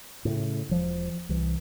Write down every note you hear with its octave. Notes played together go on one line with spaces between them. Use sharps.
A2 C#3
E1 F3
C2 E3